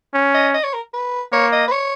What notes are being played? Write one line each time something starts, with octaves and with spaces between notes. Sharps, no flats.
C#4
D#5
D#5
C#5
A#4
B4
A#3 C#5
D#5
B4
C#5